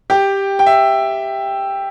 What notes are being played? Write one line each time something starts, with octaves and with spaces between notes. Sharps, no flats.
G4 G5
G5
E5